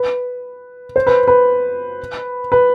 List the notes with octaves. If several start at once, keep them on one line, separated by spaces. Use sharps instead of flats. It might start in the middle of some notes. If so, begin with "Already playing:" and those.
Already playing: B4
C5
B4
B4
B4